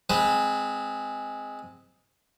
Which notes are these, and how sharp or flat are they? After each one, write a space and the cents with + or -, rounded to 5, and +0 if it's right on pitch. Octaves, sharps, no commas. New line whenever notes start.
G#3 +0 C4 -10 B4 +0